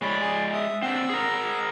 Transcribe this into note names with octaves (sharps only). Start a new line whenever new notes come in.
G#3 C#5 D5 B5
G#4 C6
E5 D#6
C4 D4 F#5 E6
G#4 A#4